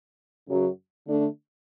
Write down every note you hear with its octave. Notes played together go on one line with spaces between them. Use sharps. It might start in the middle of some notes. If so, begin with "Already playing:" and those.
F#2 C#3 F#3
D3 A3 D4